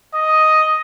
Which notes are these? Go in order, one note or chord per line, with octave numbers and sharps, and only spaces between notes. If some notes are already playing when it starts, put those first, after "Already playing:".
D#5